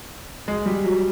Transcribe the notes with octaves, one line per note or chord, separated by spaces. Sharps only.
G#3
G3
F#3